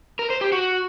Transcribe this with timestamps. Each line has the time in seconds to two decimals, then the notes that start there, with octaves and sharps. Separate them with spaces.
0.19 A#4
0.30 C5
0.41 G4
0.52 F#4